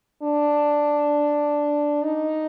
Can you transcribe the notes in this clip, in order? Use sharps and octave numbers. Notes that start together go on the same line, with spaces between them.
D4
D#4